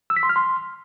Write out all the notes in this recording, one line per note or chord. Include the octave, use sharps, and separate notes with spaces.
E6
B6
C6
F6
C6